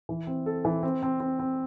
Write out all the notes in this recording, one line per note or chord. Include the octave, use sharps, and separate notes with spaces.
E3
C4
A4
E3
C4
C4
C4
C4